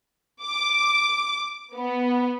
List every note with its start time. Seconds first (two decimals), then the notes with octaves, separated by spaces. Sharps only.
0.42 D6
1.74 B3